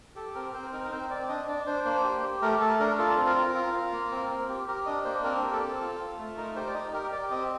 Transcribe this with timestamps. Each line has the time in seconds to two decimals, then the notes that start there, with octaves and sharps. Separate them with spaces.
0.15 G4 A4
0.35 C4 A#4
0.53 C4 C5
0.72 D#4 A#4
0.84 A#4
0.91 C4 C5
1.10 C4 D5
1.29 D4 D#5
1.48 D4 D5
1.66 D4 C5
1.85 A#3 C5
2.04 G4
2.23 G4
2.42 A3 A#4
2.61 A3 A4
2.80 D4 A#4
2.98 F4 A4
3.17 C4
3.26 A#4
3.36 F4
3.55 F4
3.73 F4
3.92 A#3
4.11 C4
4.30 C4
4.49 G4
4.68 G4 A#4
4.86 D4 D#5
5.04 A#3 C5
5.24 C4 A#4
5.42 G4
5.52 A4
5.61 C4
5.81 F4
5.99 F4
6.18 A3
6.37 D#4 A#4
6.56 G4 C5
6.67 D5
6.74 D#4 D#5
6.93 G4 A#4
7.12 G4 D5
7.31 C4 D#5